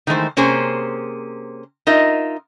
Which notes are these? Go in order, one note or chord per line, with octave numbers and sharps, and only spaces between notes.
D#3 E3 G#3 A3 C5
C3 A#3 C#4 G#4 C5
D#4 F4 A#4 D#5 E5